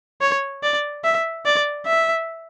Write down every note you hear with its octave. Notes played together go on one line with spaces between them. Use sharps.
C#5
D5
E5
D5
E5